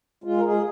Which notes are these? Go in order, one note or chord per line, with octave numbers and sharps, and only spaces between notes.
G#3 F4
A#4
G#3 G#4